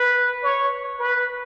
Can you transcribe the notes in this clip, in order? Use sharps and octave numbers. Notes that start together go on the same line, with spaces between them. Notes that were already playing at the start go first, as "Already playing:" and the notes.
Already playing: B4
C#5
B4